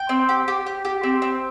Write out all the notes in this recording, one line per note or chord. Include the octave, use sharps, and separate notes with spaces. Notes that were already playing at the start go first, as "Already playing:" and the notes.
Already playing: G5
C4
G4
G4
G4
G4
C4
C4